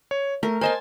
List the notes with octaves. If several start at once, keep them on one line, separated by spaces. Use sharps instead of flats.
C#5
A3 A#4
A#4 C5 D#5 G#5 A5 C6